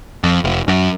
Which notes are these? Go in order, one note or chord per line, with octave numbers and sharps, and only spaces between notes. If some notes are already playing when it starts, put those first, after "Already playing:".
F2
F1
F#2